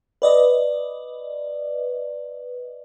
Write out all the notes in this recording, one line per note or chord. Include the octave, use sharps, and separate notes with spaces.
B4 D5 D#5